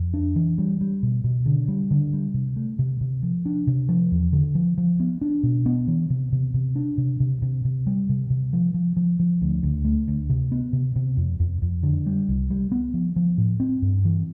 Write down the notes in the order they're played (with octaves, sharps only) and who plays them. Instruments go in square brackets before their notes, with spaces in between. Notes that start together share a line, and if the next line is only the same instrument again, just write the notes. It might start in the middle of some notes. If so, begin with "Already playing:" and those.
Already playing: [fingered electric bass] F2
D4
E3
G3
G3
B2
B2
D3
G3
D3
G3
C3
A3
C3
C3
F3
D4
C3
F3
E2
D3
F3
F3
B3
D4
B2
B3
E3
C3
C3
C3
D4
C3
C3
C3
C3
G3
C3
C3
F3
F3
F3
F3
D2
D2
A3
D2
C3
B3
C3
C3
F2
F2
F2
D3
G3
C2
G3
B3
F3
F3
A2
C4
G2
E3